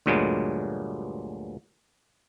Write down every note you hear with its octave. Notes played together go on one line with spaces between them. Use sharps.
D2 G2 A#2 F#3 G#3 B3